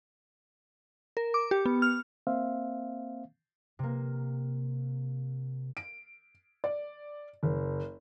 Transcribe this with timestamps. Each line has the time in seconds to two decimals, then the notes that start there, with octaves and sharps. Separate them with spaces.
1.17 A#4
1.34 D6
1.51 G4
1.66 B3
1.82 F6
2.27 A#3 C4 C5 E5 F5
3.79 C3 A#3
5.77 D7
6.64 D5
7.43 F#1